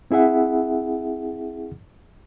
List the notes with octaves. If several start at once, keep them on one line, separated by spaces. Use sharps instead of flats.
C4 E4 G#4 E5 F#5